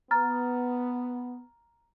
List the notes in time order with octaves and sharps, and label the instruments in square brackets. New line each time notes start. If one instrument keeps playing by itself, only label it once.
[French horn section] B3 [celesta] A#5 F6 A6